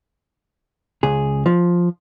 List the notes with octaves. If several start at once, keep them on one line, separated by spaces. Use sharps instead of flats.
C#2 G#4
F3